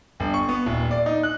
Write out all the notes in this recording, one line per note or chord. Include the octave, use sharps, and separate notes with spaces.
G1
C#6
B3
D#1
D5
D#4
F#6